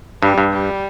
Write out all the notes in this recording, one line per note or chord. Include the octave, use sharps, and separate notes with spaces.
G2 G3
G2
G3